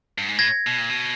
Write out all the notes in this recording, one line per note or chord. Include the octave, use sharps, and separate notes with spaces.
G2
G#2
A2 G#6 A#6
B2
A#2
B2